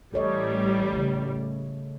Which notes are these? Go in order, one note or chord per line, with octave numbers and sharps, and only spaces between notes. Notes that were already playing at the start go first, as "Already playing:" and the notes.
A1 G3 A4 C#5 D#5
C#3 A3